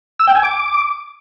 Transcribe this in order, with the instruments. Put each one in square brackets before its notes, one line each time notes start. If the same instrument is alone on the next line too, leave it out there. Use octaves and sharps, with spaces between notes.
[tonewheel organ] E6
G5
G#5
D6